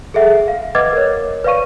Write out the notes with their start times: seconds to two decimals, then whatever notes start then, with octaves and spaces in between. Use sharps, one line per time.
0.14 G#4 A4 E5 F#5
0.48 F5
0.75 B4 D#5 F#5 D6 G#6 A6
0.93 A#4 C#5
1.44 B4 D5 F5 C#6 D#7